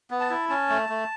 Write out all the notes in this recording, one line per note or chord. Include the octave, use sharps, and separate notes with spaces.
B3
A5
E4
C#4 A5
A3
A3